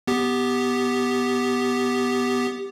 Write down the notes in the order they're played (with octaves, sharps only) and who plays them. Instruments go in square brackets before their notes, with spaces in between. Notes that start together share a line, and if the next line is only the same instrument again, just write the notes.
[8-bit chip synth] B3 G4